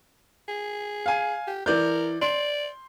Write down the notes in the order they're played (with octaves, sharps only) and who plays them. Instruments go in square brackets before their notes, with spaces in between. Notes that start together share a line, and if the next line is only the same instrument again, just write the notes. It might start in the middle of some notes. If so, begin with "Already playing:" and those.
[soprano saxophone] G#4
[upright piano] F5 G#5
[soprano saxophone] G4
[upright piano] E3 D5 G6 [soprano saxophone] A#4
[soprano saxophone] D5 [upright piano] C6